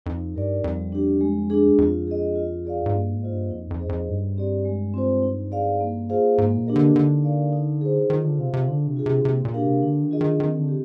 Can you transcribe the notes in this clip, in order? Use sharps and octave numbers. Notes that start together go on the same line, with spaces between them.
F2 D#4
G2 G4 A#4 D5
F2 G3
D4 G4
G#3
D4 G#4
F2 F4
G#4 D#5
F4
G#4 D5 F5
G#2
G2 A#3
G#2
F4 C5 D#5
G2
F2 D#4
F2
G#4 C5 D#5
F2
G2 G3
C4 G4 D5
G#3
C4 F4 C5
D#4
G#4 D5 F5
A#3
F4 G#4 C5 F5
G#2 A#3
A#2
D4 G4 A#4 D#5
D3
D3 D#4
A#4 D5 F5
D#4
G#4 C5
D#3 F4
D3
C3 C5 F5
C3
D3 D4
C3
F4 G#4
C3
C3 A#3
A#2
D4 G4 A#4 F5
C3
D3 D4
D#3
F4 G#4 D#5
D#3
D#3 C4
D3
G4